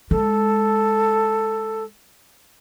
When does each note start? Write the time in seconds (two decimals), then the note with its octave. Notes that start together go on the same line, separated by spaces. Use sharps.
0.11 G#3 A4